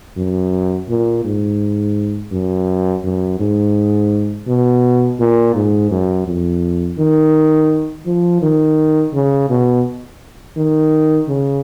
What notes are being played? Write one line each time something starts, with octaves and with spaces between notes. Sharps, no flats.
F#2
A#2
G#2
F#2
F#2
G#2
B2
A#2
G#2
F#2
F2
D#3
F3
D#3
C#3
B2
D#3
C#3